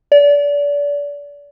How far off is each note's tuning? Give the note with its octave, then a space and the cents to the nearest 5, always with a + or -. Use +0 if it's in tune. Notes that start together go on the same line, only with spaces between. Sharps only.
D5 -30